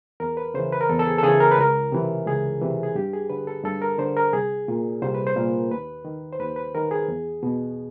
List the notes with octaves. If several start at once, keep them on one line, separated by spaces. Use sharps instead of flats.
E2 A#4
B4
C#3 E3 C5
B4
A#4
E2 A4
A4
G#4
A4
C#3 E3 G#4
A#4
B4
C#2 A#4
C3 E3
C#2 G#4
C3 E3
G#4
G2 G4
G#4
D3 B4
A4
G2 A4
A#4
D3 C5
A#4
C2 G#4
A#2
C2 C5
B4
C5
A#2
D#2 B4
D#3
C5
D#2 B4
B4
D#3 A#4
G#4
E2
B2